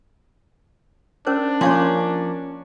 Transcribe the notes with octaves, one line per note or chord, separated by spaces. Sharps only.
C#4 D4 A#4 C5
F3 A#3 C#4 C#5 F5 C6